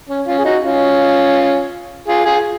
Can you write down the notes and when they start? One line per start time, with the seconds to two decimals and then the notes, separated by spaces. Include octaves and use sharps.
0.09 C#4
0.27 C#4 F4
0.38 G#4
0.45 D#4 F#4
0.63 C#4 F4
2.08 F4 G#4
2.25 F4 G#4